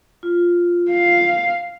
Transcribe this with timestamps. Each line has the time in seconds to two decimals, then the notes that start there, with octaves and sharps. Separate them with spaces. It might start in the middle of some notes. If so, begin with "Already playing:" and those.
0.23 F4
0.90 F5